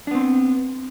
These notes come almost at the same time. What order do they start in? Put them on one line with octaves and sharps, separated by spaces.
D4 B3 C4